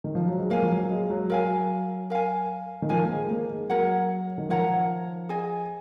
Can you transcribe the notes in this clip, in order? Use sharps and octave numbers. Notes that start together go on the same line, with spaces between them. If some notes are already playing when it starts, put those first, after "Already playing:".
D#3
F3
F#3
G#3
A#3 A#4 F5 G#5
F3
F#3
G#3
F#3
F#3 A#4 F5 G#5
A#4 F5 G#5
D#3
F3 A#4 F5 G#5
A#3
G#3
A#3
G#3
F#3 A#4 C#5 F#5 A#5
D#3
F3 A#4 C#5 F#5 A#5
G#4 D#5 G#5